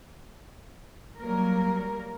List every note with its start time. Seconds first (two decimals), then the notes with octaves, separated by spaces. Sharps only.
1.20 F#3 G3 A#3 A#4